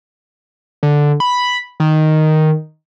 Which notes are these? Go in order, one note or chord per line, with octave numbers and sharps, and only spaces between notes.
D3
B5
D#3